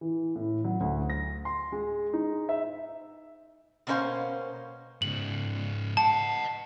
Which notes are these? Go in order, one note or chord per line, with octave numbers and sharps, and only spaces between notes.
E3
A2
F#3
D2
A#6
C6
G#3
D#4
E5
B2 A#3 C#4 F#4 C5 F5
G#2 C#3 F#7
D#5 F#5 A5